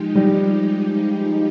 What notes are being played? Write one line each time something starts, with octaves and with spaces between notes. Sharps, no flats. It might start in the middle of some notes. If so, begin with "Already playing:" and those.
Already playing: F3 G#3 D#4 G4
G3